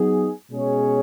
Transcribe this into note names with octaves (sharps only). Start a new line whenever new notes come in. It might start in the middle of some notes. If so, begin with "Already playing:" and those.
Already playing: F#3 B3 D#4 G#4
B2 G#3 C#4 G#4 C#5